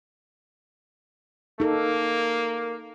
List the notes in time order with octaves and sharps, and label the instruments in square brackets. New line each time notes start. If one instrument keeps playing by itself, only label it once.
[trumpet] A#3 [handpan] D#4 A4